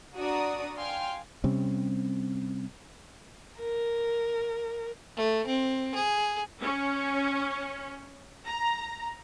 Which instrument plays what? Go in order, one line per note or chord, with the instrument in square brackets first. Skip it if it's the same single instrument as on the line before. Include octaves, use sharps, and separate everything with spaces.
[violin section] D4 F#4 D5 A#5 D#6
F5 G5 G#5 C6 F6
[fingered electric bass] C3 G3 C4 C#4
[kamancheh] A#4
[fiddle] A3
C4
G#4
[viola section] C#4
A#5